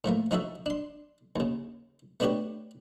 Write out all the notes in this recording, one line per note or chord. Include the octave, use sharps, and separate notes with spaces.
A2 F3 A3 A#3
F3 C#4 D#4 F#4 A4 E5
D4 C6
D#2 C#3
A3 B3 D4 F#4 G4 C#5